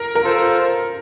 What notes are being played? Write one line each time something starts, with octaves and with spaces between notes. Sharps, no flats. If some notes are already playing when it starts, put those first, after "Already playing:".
Already playing: A#4
A#4
F4 A4 C5